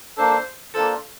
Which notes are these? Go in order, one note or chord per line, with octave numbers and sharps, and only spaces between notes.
A#3 D4 A4 C5
A#3 D4 F4 A4 C5